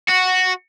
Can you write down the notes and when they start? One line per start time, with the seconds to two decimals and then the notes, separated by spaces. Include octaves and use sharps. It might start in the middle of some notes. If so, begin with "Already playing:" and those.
0.09 F#4